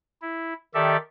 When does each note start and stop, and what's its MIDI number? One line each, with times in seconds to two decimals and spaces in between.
0.22 0.53 64
0.74 0.97 51
0.74 0.97 67
0.74 0.97 69
0.74 0.97 74
0.74 0.97 76